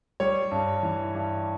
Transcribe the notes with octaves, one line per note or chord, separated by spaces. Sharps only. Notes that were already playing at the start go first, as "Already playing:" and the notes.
G3 C#5
G2
E3
G2